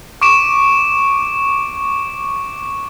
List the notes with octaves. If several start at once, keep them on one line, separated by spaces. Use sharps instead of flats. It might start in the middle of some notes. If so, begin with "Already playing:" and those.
C#6 D6 D7 E7